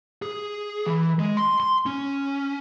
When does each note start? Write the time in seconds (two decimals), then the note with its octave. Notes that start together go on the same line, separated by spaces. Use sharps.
0.22 G#4
0.86 E3
1.19 G#3
1.37 C6
1.60 C6
1.86 C#4